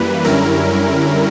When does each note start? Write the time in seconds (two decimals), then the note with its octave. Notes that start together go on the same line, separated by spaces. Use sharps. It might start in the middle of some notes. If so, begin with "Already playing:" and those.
Already playing: F#2 E3 G3 A#3 B4
0.24 F#2 D3 G3 C#4 E4 A#4